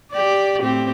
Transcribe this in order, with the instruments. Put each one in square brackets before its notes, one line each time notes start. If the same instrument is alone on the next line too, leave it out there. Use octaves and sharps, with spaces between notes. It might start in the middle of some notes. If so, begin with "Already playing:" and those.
[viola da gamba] G4 D5
A2 C4 G4